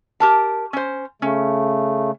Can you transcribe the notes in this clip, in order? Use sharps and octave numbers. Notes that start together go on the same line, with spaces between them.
G4 A#4 A5
C#4 C5
C#3 A3 C#4